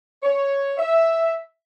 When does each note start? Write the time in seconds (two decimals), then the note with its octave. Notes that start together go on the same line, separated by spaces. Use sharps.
0.23 C#5
0.78 E5